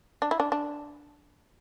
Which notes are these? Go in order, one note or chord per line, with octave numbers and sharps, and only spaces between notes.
D4
E4
D4
D4